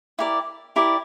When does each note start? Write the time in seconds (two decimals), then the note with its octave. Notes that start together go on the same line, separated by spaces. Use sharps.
0.19 E4 G4 A#4 D5
0.76 E4 G4 A#4 D5